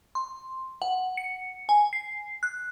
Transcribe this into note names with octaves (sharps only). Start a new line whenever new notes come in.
C6
F#5
C#7
G#5
C7
F#6